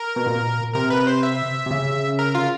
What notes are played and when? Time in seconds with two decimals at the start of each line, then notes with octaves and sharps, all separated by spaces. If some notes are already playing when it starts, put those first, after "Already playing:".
Already playing: A#4
0.16 B2
0.27 A#2
0.74 C3 A#4
0.90 B4
1.07 C5
1.23 E5
1.66 C3
1.71 C#3
2.19 A#4
2.35 F4